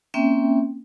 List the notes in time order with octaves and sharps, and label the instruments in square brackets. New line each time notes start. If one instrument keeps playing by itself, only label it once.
[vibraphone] A#3 C4 C#4 E5 G5